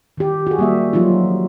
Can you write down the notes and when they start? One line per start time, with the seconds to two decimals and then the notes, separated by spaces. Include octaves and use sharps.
0.18 D#3 G4
0.47 F#4 G#4
0.59 G3 A#3 E5
0.93 F3 F#3 A#3 D#4 F4